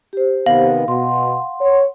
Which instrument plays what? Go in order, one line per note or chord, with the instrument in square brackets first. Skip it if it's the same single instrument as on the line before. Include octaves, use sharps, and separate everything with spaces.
[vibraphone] G4 C5
[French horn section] C3 D#3 B3 [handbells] F5
[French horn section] B2 [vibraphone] F#5 C6
[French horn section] C#5